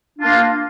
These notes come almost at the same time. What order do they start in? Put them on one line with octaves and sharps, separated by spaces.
D4 F4 A#3